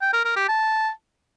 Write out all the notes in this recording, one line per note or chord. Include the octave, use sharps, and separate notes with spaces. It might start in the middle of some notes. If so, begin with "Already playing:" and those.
G5
A#4
A#4
G4
A5